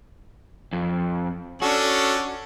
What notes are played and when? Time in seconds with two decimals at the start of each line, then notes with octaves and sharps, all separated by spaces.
0.73 F2
1.62 C#4 D4 F#4 A4